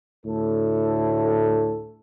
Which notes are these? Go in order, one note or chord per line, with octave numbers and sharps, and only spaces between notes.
D2 A2 A4